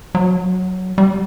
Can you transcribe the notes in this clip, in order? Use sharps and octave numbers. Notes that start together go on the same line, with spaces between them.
F#3
G3